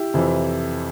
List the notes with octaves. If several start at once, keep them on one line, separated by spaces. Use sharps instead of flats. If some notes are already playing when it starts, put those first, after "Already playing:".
Already playing: E4 G4
F2 C3 E3